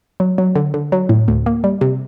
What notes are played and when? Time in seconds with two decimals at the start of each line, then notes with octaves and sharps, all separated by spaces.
0.20 F#3
0.38 F#3
0.55 D3
0.74 D3
0.92 F#3
1.09 A2
1.28 D2
1.46 A#3
1.64 G3
1.81 C3